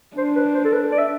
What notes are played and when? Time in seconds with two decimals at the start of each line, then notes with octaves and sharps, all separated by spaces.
0.16 D4 C5
0.36 B4
0.54 C5
0.64 A4
0.73 B4
0.92 D5
0.98 E5